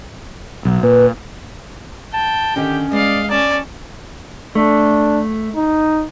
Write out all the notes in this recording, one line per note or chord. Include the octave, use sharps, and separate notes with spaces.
B1
A#2 B4
G5 A5
D3 D#3 C#4 G4
G2 G#3 D5 D#5 F5
C#4 D5 A5
A3 D4
D#4